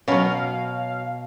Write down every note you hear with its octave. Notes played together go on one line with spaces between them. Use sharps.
B2 F#3 C#4 F5